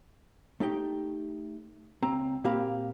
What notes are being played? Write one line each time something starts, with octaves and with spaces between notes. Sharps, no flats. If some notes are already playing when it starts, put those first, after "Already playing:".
A3 D#4 G4 G5
C#2 C4 A#5
A#2 A#3 C4 G4 F5 B5